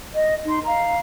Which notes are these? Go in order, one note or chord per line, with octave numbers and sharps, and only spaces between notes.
D#5
D#4 C6
F5 A#5